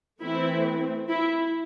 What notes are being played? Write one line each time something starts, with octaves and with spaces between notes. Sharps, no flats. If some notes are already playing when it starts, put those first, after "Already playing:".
E3 A3 C4 E4
E4